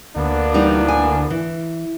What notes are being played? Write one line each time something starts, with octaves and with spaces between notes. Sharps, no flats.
D2 A#3 B3 D4
E3 G3 D#4
G#5
E3